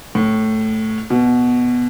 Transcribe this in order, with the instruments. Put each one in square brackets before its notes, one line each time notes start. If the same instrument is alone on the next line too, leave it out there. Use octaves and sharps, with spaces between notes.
[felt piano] A2
B2